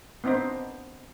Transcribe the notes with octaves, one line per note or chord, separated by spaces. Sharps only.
B3 C4 D4 D#4 C5